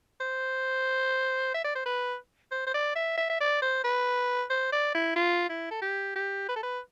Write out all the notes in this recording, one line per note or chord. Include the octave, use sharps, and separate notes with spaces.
C5
E5
D5
C5
B4
C5
C5
D5
E5
E5
E5
D5
C5
B4
C5
D5
E4
F4
E4
A4
G4
G4
B4
A4
B4